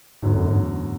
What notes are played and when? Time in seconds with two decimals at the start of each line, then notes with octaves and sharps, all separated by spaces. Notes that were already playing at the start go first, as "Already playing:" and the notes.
0.22 E2 G#2 D3 F#3 A3 C#4
0.35 F#2
0.47 G#2